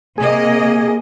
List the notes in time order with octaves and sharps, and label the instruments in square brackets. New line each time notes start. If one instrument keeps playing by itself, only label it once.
[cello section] C3 A#3 D#5 [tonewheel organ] G#4